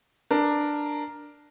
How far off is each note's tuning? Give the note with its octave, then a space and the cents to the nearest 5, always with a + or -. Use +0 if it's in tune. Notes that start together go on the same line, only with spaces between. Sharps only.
D4 +5 A#4 +0